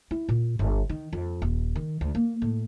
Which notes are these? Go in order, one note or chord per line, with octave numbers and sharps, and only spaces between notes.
E4
A#2
G1
D#3
F2
D#1
D#3
D2
A#3
A2